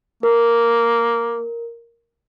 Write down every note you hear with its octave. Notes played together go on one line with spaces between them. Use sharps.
A#3 A#4